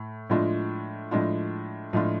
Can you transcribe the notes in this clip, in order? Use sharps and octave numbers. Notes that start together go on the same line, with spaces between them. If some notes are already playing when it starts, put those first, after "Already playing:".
Already playing: A2
A2 F3 G#3 D4 F4
A2 F3 G#3 D4 F4
A2 F3 G#3 D4 F4